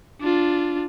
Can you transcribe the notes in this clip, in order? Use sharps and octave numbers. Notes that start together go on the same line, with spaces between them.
D4 F4